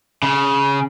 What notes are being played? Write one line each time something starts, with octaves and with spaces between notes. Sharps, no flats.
C#3